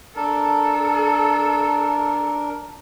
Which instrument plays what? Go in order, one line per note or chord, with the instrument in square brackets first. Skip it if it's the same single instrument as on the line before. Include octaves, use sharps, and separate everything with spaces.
[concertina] D4 A#4 [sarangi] A4